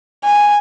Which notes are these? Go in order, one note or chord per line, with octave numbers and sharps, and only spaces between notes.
G#5